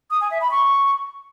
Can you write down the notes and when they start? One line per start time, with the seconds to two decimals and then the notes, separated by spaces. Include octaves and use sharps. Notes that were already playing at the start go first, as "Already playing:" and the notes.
0.11 D#6
0.21 G#5
0.31 E5
0.41 B5
0.51 C#6